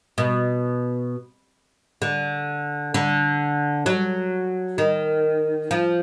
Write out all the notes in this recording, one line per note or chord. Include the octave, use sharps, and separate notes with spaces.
B2
D3
D3
F#3
D#3
F3